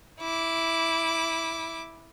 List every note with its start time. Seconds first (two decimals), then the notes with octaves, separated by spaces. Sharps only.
0.20 E4 D6